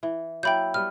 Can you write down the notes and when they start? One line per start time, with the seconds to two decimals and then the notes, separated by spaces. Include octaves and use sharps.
0.03 E3
0.43 F#3 A#3 E4 G5 B5 G6
0.74 G3 B3 F6